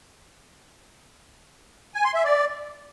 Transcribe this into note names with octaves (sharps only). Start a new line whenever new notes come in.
G#5
C6
E5
D5